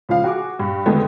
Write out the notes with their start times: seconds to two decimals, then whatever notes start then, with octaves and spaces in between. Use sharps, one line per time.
0.09 C#2 F3 F5
0.24 F#4 G#4 D6
0.59 G2
0.86 F2 D3 D#3 G#3 A3 B3